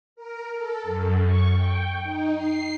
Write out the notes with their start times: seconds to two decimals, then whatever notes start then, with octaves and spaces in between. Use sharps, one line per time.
0.16 A#4
0.53 A4
0.83 F#2
1.24 C#6
1.54 G5
2.03 D#4
2.35 C7